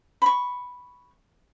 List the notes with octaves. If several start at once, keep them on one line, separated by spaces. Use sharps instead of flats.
B5 C#6